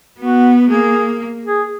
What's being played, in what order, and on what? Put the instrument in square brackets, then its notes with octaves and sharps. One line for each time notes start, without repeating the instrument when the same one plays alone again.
[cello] B3 [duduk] F#4
[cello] A#3 [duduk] G#4
[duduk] G#4